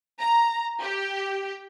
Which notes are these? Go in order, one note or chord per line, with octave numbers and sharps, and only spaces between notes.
A#5
G4